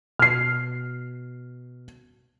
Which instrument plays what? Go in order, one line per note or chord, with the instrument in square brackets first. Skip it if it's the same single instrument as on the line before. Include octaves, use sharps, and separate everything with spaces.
[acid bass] B2 [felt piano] F6 C7